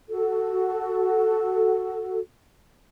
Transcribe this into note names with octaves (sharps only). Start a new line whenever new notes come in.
F#4 A4